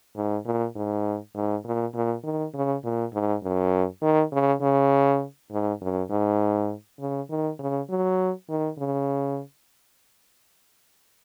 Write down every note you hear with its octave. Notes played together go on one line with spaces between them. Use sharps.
G#2
A#2
G#2
G#2
A#2
A#2
D#3
C#3
A#2
G#2
F#2
D#3
C#3
C#3
G#2
F#2
G#2
C#3
D#3
C#3
F#3
D#3
C#3